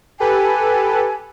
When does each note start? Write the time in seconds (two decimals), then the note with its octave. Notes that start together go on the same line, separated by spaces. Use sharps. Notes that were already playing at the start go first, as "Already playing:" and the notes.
0.20 G4 A4 B4 G#5